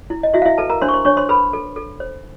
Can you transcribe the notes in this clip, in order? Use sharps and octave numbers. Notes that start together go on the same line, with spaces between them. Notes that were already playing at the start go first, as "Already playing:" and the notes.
E4
D#5
E4 F#4 E5
F5
E4 E5
A4 B4 A5
A#4 A#5
D4 C5 C6
C#6
C5 C6
D4 C#5 C#6
C5 C6
A4 B4 B5
A4
A4
C5